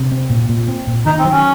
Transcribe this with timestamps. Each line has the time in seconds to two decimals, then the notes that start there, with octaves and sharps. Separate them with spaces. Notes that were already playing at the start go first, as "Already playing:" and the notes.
Already playing: C3
0.11 C4
0.30 A#2
0.49 A#2
0.68 C4
0.87 A#2
1.06 D#3 D#4
1.19 C4
1.25 F#3
1.32 C#4